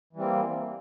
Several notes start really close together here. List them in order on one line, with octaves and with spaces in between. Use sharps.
E3 G3 C4 A#3